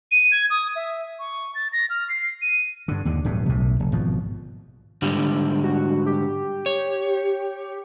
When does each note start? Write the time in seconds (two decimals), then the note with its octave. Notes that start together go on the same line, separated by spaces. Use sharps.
0.12 D#7
0.32 G#6
0.50 D#6
0.76 E5
1.19 C#6
1.55 A6
1.73 A#6
1.90 F6
2.09 C7
2.42 D#7
2.88 G2 D3
3.05 D#2 D3
3.25 D1 D2 G2 B2
3.49 B1 A2 C3
3.80 F1
3.92 G#1 B2 F3
5.02 G#2 D3 G3
5.64 F#4
6.06 G4
6.66 C#5